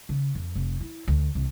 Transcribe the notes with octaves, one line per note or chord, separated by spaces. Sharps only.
C#3
F2
F1
E4
D2
C2